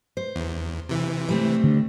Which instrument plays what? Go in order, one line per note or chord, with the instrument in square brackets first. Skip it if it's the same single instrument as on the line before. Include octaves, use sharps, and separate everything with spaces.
[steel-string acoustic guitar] C5
[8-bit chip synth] E2
C3 E3
[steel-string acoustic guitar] G3 A3 C4
[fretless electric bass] D3